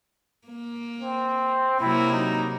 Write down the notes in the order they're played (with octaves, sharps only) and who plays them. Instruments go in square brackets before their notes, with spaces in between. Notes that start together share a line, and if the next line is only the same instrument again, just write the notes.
[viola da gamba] A#3
[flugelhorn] C4
[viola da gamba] C3 F#3 A#3 [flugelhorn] E4
[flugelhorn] D#4